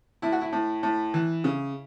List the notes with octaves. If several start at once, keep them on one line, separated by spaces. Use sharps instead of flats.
A2 E4
F#4
E4
A2
A2
E3
C#3